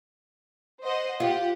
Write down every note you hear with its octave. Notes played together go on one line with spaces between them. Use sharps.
C5 D#5 F#5
F4 G4 F#5